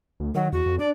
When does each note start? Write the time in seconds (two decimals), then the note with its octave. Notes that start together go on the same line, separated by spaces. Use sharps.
0.20 D2
0.35 D#3 F#3
0.53 E2 F#4
0.66 F2
0.79 D4 D5